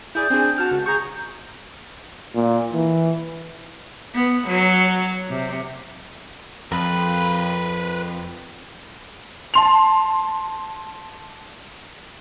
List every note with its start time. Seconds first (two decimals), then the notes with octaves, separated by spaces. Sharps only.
0.15 E4 G#4 D5 G6
0.30 C4 D4 G#4 G#5
0.58 F#4 A5 F6
0.71 C#2
0.86 G#4 A#5 C#6 G6
2.35 A#2
2.73 E3
4.15 B3
4.47 F#3
5.30 C3
6.72 F2 A#4 B4
9.54 A5 C6 F7